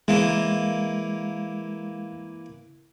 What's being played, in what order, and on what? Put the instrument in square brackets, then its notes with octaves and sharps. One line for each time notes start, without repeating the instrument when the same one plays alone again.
[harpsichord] E3 A#3 [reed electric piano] G#3